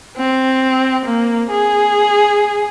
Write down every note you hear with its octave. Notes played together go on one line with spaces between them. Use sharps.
C4
A#3
G#4